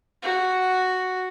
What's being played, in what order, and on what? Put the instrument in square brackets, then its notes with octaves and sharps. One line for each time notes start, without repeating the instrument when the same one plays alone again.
[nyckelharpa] F#4